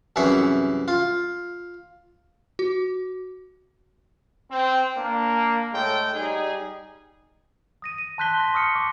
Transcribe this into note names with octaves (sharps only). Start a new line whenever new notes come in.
C2 F#2 E3 G#4 E5 C#6
F4
F#4
C4
A#3 D4
A2 G#3 A4 G5
G3 D#4 G#4
D#6 A#6 D#7
D#7
A5 C6 F#6 G6 B6 G7
C6 A#6
C#6 D#6 F6 C#7
D6